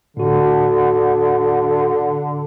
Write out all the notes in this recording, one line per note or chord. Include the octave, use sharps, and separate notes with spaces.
A2 D3 F#4